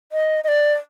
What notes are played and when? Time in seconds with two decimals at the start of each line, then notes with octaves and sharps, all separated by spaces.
0.12 D#5
0.44 D#5
0.48 D5